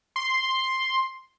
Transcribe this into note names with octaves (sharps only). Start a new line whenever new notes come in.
C6